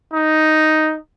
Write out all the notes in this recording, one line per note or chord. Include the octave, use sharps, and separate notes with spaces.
D#4